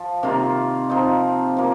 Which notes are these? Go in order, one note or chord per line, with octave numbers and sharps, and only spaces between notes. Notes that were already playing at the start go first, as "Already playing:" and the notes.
Already playing: F3
C3 D#3 A#3 F4
F3 C4 D#4
F3 A#3